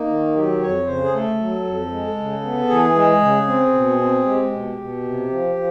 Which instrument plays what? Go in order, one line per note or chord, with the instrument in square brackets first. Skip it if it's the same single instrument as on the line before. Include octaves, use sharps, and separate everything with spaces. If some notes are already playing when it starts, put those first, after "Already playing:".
Already playing: [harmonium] A#3 D#4
D#3
F#3 G4
F2 C#5
C#3 C5
G#4
A3 A4
F#3
F2
G#3
C#3
B3
E3 G#4
G#3
C#3
C4
B2
C4
G#3 G4
B2
B2
C3
F3
F3